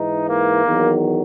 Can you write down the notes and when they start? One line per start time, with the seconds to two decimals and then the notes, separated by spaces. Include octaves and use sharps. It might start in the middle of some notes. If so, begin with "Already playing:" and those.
Already playing: G#2 E3 D#4
0.28 A#3
0.63 E2 D#3 F#3